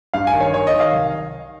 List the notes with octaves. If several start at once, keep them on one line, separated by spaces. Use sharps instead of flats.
G2 F5
G#5
D#3
C#5
D#3 C#5
D#5
D#3
F5
C2